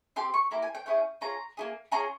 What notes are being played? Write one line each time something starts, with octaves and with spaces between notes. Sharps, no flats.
C4 G4 C6
C#6
A#3 E4 G4 A#5
G#5
G5
C#4 E4 G#4 G5
C#4 F4 G#4 A#5
A#3 E4 G#4
C#4 F4 G#4 A#5